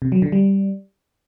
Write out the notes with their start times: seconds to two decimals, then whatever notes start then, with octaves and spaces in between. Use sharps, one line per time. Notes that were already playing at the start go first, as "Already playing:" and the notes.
0.02 C3
0.12 F#3
0.22 D3
0.32 G3